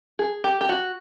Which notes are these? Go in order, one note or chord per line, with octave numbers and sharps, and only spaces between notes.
G#4
G4
G4
F#4